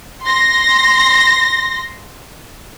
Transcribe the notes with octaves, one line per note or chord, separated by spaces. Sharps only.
C6 A#6